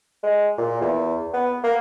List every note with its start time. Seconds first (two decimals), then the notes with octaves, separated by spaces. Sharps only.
0.24 G#3
0.58 A#2
0.81 E2
1.34 B3
1.64 A#3